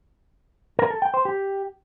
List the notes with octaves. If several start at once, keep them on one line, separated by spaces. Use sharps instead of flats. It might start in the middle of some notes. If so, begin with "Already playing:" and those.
A#4
A4
G5
C5
G4